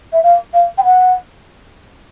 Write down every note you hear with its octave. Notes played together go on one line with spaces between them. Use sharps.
E5
F5
F5
G5
F#5